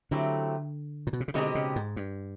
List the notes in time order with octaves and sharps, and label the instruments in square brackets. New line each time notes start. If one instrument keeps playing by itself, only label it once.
[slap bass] D3 [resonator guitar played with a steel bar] F#3 A3 C4 E4 G4
[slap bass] A#2
B2
C3
C#3
[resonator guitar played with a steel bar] B2 G#3 C4 D#4 G4 [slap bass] D3
[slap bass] C#3
G#2
G2